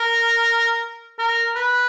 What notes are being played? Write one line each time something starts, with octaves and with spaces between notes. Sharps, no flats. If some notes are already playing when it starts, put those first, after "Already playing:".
Already playing: A#4
A#4
B4